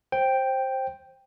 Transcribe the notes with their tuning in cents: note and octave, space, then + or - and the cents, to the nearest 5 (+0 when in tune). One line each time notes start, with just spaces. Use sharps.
C5 +15 G5 +0